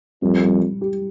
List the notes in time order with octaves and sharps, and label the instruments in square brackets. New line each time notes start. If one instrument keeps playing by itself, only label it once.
[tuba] F2 [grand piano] G3
[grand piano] G3
G3
G4